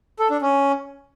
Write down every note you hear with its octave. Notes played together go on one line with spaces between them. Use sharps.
A4
D4
C#4